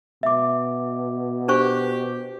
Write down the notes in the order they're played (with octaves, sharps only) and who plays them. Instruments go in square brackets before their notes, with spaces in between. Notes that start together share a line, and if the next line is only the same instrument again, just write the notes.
[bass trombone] B2 [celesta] E5 D6
[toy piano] D4 C5 C#6 [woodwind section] G4